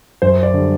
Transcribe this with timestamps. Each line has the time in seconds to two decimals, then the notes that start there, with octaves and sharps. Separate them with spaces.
0.22 F#2 C5
0.43 D5
0.54 D3 G3